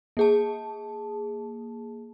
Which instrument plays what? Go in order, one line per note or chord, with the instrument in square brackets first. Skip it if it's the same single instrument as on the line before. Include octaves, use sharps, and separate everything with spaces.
[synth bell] A#3 G#4 A5